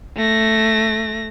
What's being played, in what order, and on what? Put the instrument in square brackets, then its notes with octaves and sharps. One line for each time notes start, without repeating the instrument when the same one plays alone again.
[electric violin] A3 A#6